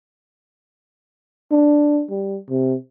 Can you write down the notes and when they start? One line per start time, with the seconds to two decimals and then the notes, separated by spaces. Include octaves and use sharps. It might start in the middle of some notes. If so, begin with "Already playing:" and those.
1.52 D4
2.10 G3
2.50 C3